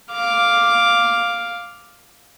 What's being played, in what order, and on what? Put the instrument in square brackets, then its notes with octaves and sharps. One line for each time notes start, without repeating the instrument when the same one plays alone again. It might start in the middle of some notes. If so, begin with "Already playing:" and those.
[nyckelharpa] F5 D6